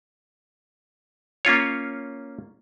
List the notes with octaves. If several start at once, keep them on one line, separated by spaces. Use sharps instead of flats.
A#3 C#4 F4 C#5